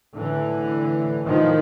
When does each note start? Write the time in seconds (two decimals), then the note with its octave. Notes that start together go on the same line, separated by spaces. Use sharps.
0.16 A2 D3 E3
1.25 A2 D#3 F3